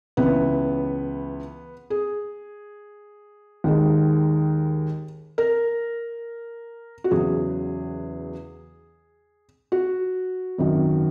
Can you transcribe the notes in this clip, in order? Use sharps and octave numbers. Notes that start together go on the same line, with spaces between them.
C#2 C#3 E3 B3
G#4
D#2 D#3 G#3
A#4
F#4
E2 C#3 F#3 G#4
F#4
G#1 F#2 D#3 F#3